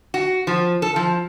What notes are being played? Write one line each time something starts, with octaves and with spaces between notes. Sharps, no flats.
F#4
F3
A4
F3